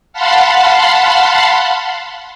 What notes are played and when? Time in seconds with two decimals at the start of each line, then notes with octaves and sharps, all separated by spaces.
0.13 F5 F#5 A5 B5 C6